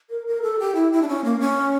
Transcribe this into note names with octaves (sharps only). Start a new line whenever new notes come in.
A#4
A#4
A4
G4
E4
E4
D4
C#4
A#3
C#4